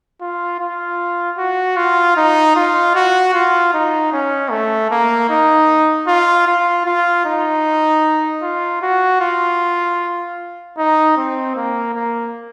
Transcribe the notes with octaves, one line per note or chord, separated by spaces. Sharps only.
F4
F4
F#4
F4
D#4
F4
F#4
F4
D#4
C#4
A3
A#3
D#4
F4
F4
F4
D#4
F4
F#4
F4
D#4
C4
A#3
A#3